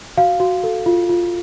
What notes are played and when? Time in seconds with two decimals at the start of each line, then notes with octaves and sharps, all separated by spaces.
0.17 F#4 F5
0.40 F#4
0.64 A4
0.86 F4
1.09 F4